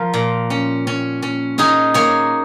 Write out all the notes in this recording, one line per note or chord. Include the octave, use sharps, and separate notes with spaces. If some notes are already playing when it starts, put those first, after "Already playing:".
Already playing: F3 F4 A#4
A#2
C#4
C#4
C#4
C#4 D#4 G#4
A#3 G#4 C#5